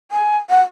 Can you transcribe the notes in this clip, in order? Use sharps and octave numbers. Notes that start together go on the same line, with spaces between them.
G#5
F#5